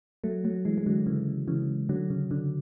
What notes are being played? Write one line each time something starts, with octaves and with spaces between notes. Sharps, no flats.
F#3 A3
F#3 A3
E3 G#3
G#3
D3 F#3
C#3 E3
C#3 E3
D3 F#3
C#3
D3